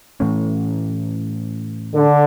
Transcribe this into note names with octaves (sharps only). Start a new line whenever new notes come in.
A2 E3 A3 C#4
D3